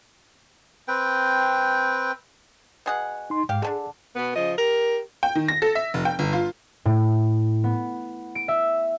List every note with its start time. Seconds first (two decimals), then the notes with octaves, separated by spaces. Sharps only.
0.88 C4 B4 G5
2.86 B2 G#4 F#5
3.30 D#4 C6
3.49 G#2 G4 F5
3.62 D3 C#4 D4 G#4
4.16 B2 B3
4.36 C#3 F3 D#5
4.58 G4 A#4
5.23 G5
5.35 D#3
5.48 A#6
5.62 A4
5.75 E5
5.94 F1
6.05 G5
6.19 G1
6.33 F4
6.85 A2
7.64 B3
8.35 D7
8.48 E5